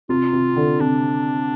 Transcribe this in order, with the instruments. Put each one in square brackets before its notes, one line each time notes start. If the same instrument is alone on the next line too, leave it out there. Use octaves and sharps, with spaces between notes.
[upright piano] C3 [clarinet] F4
[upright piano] C3
D3
[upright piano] C3 [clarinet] D4